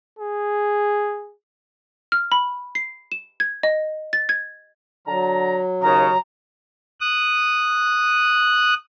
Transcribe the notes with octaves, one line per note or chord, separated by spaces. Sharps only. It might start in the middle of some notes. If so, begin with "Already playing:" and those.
G#4
F6
B5
C7
E7
G#6
D#5
A6
G#6
D3 F#3 A5 A#5
D#2 C#3 A#5
D#6 F#6